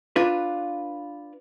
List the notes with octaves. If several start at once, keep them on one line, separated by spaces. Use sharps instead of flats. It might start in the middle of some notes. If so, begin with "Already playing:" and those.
D4 F4 B4